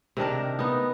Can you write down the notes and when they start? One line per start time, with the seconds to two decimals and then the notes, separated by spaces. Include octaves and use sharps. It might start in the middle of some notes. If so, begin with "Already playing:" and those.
0.17 C3 D#3 D4 A#4
0.59 B3 D#4